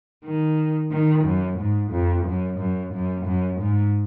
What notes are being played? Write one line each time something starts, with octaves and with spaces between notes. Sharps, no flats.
D#3
D#3
F#2
G#2
F2
F#2
F#2
F#2
F#2
G#2